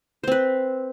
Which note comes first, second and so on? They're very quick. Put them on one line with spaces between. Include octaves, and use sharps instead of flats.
C5 C4 B4